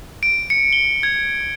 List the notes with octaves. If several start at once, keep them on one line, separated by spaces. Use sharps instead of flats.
D7
C#7
G7
G#6